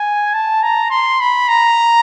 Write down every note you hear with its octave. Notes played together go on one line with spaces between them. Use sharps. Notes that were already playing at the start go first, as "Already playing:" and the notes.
Already playing: G#5
A5
A#5
C6
B5
A#5